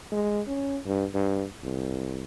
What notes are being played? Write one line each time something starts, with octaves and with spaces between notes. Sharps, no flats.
G#3
C#4
G2
G2
C2